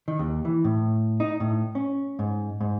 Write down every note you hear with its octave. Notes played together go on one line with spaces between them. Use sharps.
D#3
D#2
E3
A2
D#4
A2
C#4
G#2
G#2